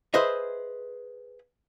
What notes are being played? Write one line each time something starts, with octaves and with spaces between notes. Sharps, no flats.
G#4 B4 C5 D#5 E5